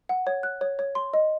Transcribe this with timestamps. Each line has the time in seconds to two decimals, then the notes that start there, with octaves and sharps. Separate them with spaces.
0.09 F#5
0.27 C#5
0.43 F#6
0.61 C#5
0.79 C#5
0.95 C6
1.14 D#5